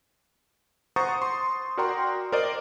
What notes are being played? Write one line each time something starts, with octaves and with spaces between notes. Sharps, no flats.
C5 F#5 A#5 C#6 D#6 A6
C6
F#4 A#4 D5 G5 A#5 C6
A#4 C5 D5 D#5